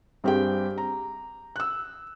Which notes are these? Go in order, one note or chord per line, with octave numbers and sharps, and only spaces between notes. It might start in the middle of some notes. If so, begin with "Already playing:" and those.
G2 C4 G4 G#4 G5
A#5
E6 F#6